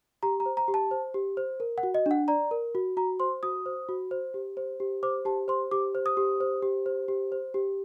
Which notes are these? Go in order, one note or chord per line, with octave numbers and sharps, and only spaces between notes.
G4 A#5
A#5
C5
A#5
G4
A5
C5
G4
C5
A#4
F#5
F#4
D#5
D4 F#5
D5 A#5
A#4
F#4
F#4 A#5
C5 C6
F#4 D#6
C5
F#4
C5
G4
C5
G4
C5 D6
G4 A5
C5 C6
G4 D6
C5
D#6
G4
C5
G4
C5
G4
C5
G4